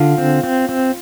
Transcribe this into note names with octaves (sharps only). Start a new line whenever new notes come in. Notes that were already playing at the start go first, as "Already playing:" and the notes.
Already playing: D3 F4
C4
C4
C4